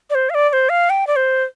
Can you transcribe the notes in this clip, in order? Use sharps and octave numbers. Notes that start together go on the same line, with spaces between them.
D5
C5
F5
D5
D5
C5
F5
G5
D5
C5